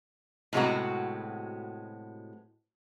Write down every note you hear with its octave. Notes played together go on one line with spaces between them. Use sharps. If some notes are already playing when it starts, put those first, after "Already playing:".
A2 C3 F#3 G#3 B3 F#4